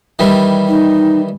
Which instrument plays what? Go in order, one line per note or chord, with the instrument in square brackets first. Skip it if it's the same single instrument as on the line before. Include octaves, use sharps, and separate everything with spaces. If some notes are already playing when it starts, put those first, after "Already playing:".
[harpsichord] D#3 E3 G3
[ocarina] D#4